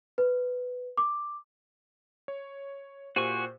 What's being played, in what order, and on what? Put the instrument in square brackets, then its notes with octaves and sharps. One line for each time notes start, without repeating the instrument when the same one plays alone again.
[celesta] B4
D6
[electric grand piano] C#5
[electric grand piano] A#2 G4 C5 [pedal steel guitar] F#4 G#5 C#6